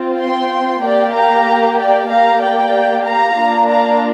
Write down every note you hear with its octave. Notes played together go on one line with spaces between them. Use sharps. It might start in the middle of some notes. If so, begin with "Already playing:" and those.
Already playing: C4 F4
G5 C6
A#3 G4 D5 G5
F5 A#5
D5 G5
A#3 G4 F5 A#5
D5 G5
F5 A#5
A#3 D4 F4
F5 A#5